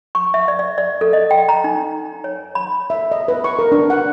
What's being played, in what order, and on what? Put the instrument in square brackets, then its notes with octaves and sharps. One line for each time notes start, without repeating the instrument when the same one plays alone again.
[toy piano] C#6
E5
D5
D5
D5
A4
D#5
G5
A#5
D#4
C#5
B5
[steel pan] E5
D#5
B4
C#6
A#4
D4
F#5